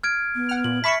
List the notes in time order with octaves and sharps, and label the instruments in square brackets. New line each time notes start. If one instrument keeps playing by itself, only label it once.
[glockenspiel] F6 G#6 D7
[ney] B3
[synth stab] F#5 F6
[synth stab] A#2 [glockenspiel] F#7
[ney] E5 [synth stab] A5 B5 C#6 [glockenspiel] B6 C#7